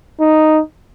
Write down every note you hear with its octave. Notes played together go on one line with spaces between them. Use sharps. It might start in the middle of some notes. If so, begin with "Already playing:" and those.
D#4